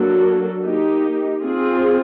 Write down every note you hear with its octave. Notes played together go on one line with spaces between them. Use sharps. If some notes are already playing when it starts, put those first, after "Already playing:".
Already playing: F#3 A#3 D4 F#4 A4
A#3 D#4 G4
C4 F4 G#4